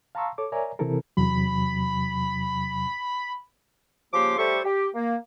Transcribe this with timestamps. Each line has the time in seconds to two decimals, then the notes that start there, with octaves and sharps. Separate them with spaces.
0.15 F5 A5 A#5 C6 C#6 E6
0.38 A4 C#5 D6
0.52 A#4 C#5 D5 E5 G#5 A#5
0.79 C3 E3 C4 E4 A4 A#4
1.17 E2 C3 F#3 B5
4.13 C#3 F3 A#3 G4 C6 D6
4.38 G3 A3 G4 A4 C5 C#6
4.64 G4
4.95 A#3